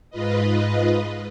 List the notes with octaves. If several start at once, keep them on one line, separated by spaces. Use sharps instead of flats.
G#2 F4 B4 D#5